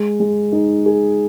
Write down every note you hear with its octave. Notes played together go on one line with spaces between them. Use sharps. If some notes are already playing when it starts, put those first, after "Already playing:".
Already playing: G#3
G#3
D#4
G#4